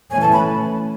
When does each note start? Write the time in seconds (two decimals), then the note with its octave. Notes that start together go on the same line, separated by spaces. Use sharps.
0.11 E3 A3 C#4 G#5
0.21 A5
0.33 B5